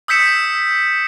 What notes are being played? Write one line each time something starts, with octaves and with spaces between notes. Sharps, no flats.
D#6 E6 G6 B6 C#7 E7